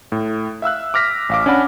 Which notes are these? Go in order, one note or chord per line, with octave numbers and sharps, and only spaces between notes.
A2
E5 F5 E6 F#6
D6 F6 A#6 B6
A1 F5 D6
C#4 D4 D5 F#5 B5